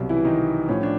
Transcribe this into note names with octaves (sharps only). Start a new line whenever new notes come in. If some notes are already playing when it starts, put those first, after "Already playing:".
Already playing: C2 B2 F#3
E3 E4
D#3 D#4
A2 F3 C#4
D4